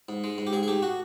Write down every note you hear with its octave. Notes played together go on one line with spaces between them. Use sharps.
G#2
G#3
G#2
G4
G#2 G#4
G#4
A3 G4
F#4